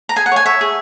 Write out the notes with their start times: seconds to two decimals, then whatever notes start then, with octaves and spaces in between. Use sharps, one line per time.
0.09 A#5
0.16 G#4 G#5
0.26 F#5
0.32 C#5 G#5
0.46 C#5 E5
0.61 G#4